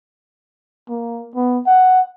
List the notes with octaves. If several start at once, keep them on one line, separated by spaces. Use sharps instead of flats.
A#3
B3
F#5